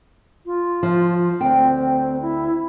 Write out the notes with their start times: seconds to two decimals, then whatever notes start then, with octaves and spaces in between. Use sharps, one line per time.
0.46 F4
0.83 F3
1.41 D2 C4 G5
2.21 E4